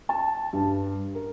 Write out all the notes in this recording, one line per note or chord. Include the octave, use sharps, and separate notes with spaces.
A5
G2
A#4